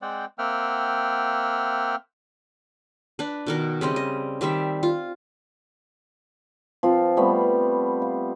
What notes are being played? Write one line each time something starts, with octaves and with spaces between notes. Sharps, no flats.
G#3 C4 C5 D5 F#5 G5
A#3 C4 E5 F#5 G5 F6
D4 B4
B2 D#3 A#4
C#3 G3 C4 D#5
D#5
D#3 G3 C4 E5
F4
F3 C4 F4
G3 A3 B3 C4
F5